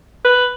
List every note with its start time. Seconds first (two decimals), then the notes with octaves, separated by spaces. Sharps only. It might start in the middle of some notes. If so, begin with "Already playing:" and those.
0.24 B4